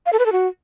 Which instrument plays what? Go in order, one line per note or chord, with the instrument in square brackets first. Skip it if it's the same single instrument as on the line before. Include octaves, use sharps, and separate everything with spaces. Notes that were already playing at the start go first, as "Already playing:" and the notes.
[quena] F5
A4
B4
A4
F#4